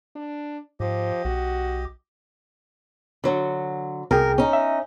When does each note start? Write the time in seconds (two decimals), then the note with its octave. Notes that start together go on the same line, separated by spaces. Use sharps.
0.16 D4
0.80 G#2 F3 G4 D#5
1.25 B1 F#4
3.24 D3 F#3
4.11 C2 G#4 A#4 G5
4.38 C#4 D#4
4.53 E5